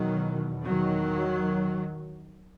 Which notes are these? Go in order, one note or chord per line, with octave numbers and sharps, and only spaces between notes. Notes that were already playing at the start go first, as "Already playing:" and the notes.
Already playing: E2 B2 D#3 F#3
D#3 F#3